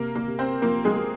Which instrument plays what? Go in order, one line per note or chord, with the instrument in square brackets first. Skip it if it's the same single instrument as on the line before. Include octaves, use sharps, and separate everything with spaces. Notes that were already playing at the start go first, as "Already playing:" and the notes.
Already playing: [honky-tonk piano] C3 A#3 A#4
A#3 A#4
C3
C4 C5
F3 A#3 A#4
G#3 G#4
G#3